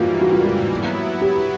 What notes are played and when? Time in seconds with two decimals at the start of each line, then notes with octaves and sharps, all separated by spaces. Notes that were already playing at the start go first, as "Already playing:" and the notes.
Already playing: G#2 E3 G3 A#3 F4 F#4
0.21 F#4
0.32 F4
0.46 F#4
0.71 F#3 B3 E4
1.21 G4